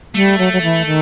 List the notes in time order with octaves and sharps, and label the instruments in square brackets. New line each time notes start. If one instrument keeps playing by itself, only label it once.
[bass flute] G3 [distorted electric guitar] A3
[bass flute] F#3
F#3
E3
D#3